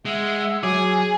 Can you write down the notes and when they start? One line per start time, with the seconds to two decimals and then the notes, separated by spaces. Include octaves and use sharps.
0.05 G#3 E5 F#5 E6
0.63 F#3 G#4 G#5 D6